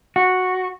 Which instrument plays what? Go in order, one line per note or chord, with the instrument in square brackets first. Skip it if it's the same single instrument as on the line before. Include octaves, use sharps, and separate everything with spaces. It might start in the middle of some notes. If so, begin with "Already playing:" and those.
[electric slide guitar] F#4